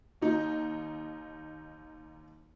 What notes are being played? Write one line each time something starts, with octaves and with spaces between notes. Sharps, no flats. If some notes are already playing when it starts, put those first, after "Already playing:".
D#2 D#4